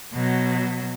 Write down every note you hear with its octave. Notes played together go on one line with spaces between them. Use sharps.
B2 F#3